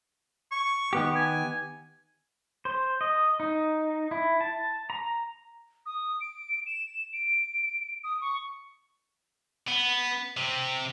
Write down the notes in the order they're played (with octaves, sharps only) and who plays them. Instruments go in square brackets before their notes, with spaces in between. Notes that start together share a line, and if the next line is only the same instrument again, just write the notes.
[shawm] C#6
[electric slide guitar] D#3 B3 G4
[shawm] G#5
[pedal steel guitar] C5
D#5
D#4
E4
A5
A#5
[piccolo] D#6
D7
E7
D7
D#6
C#6
[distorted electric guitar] B3
C3